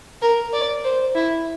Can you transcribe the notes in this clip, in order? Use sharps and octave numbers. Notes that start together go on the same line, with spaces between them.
A#4
D5
C5
E4